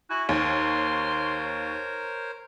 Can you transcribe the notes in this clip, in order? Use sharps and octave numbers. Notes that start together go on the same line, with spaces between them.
E4 F#4 G#5
D#2 A#4 C5 C#5 C6